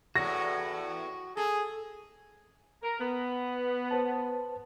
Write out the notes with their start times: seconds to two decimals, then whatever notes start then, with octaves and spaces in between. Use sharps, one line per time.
0.16 E2 A2 F#4 A#6
1.37 G#4 A4
2.83 A#4
3.00 B3
3.91 B4 C5 A5